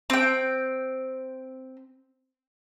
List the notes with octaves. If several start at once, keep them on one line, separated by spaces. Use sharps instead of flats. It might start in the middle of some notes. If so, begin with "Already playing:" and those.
C4 G5